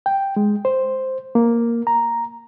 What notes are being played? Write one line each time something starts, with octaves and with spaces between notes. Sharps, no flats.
G5
G#3
C5
A#3
A#5